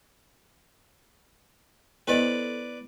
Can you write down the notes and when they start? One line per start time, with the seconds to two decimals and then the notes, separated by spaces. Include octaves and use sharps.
2.07 B3 E4 A4 B4 C5 D5 D#5